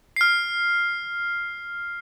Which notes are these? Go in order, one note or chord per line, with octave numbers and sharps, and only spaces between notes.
F6 C7